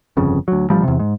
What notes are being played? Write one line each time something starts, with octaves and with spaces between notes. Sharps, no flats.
G1 F2 C#3
D2 F#3
A1 F3 G3
E2 C3
G#2